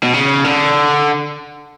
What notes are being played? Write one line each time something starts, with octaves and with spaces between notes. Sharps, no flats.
B2
C#3
D3